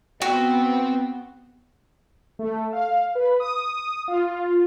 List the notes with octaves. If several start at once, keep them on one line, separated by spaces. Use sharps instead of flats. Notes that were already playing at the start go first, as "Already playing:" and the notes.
B3 C4 F#4 G5
A3
F5
B4
D#6
F4